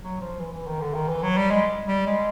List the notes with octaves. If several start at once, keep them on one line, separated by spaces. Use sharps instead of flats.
F#3
F3
E3
E3
D#3
D3
D#3
E3
F#3
G3
G#3
G3
G#3